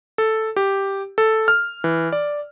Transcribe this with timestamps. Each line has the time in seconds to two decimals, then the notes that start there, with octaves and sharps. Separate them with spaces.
0.18 A4
0.56 G4
1.18 A4
1.48 F6
1.84 E3
2.12 D5